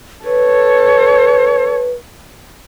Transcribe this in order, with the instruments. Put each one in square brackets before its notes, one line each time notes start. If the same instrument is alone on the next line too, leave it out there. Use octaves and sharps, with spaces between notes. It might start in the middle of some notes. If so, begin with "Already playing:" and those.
[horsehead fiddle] A4 C#5 [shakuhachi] B4